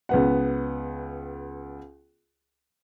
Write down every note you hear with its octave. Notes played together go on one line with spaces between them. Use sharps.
C#2 B3 F#5